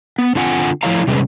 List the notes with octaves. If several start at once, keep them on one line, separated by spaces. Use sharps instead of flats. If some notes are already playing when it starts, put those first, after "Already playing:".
B3
D3 C4 F4 F#5 G#5
F3 A3 E4 C#5 F5 A#5
C3 G3 G#3 C#4 G#4 B4